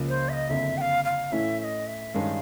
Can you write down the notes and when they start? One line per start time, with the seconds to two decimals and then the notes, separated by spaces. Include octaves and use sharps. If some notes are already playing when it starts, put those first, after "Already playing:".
Already playing: C#2 C#3 F3 A#3
0.08 C5
0.29 E5
0.33 D#5
0.50 F#1 F2 D3 E5
0.78 G5
0.81 F5
1.05 F5
1.32 A2 E3 A3 C#4 E5
1.60 E5
1.64 D#5
1.87 E5
2.14 G2 D#3 G#3 C#4 F5